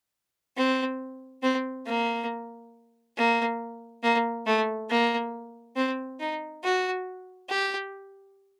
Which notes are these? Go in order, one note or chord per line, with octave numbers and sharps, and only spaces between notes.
C4
C4
A#3
A#3
A#3
A3
A#3
C4
D#4
F#4
G4